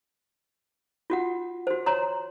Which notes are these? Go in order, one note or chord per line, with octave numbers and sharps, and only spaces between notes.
F4 F#4 F#5
F#4 C5
C#5 A#5 C6